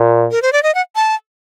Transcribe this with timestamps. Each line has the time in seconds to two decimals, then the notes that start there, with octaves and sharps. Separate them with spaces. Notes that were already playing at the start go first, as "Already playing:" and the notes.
Already playing: A#2
0.31 A#4
0.42 C5
0.53 D5
0.63 D#5
0.75 F#5
0.96 A5